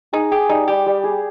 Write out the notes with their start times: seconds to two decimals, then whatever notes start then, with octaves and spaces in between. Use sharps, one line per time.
0.13 D#4 G#4
0.31 G4 G#4
0.49 G3 D#4
0.68 G3 G4
0.86 G3
1.04 G#4